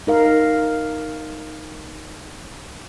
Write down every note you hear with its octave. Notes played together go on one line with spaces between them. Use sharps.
D#4 A#4 F5